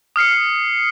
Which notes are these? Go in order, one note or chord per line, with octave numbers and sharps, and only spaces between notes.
D#6 F6 C7 C#7